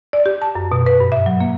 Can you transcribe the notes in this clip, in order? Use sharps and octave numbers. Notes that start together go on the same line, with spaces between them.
D5
G4
A5
F#2
B2
B4
G2
E5
F#3
A#3